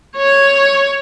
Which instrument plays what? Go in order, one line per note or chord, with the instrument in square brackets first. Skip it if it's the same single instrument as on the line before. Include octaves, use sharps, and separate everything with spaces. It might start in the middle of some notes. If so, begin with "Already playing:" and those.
[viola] C#5